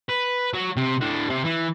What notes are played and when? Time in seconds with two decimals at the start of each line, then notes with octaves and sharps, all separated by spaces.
0.09 B4
0.54 F#3
0.77 C3
1.01 A2 D4
1.30 C3
1.44 E3